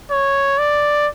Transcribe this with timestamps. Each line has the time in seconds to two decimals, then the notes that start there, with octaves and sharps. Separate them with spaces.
0.11 C#5
0.58 D5